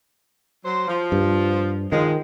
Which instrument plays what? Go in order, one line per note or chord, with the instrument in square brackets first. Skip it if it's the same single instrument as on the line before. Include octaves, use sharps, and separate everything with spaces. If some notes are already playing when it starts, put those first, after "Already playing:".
[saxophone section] F#3 C5
F3
[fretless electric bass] G2
[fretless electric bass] D#3 [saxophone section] F3 G#3